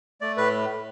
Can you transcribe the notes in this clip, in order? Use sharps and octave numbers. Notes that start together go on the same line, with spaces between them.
A3 D5
A2 B4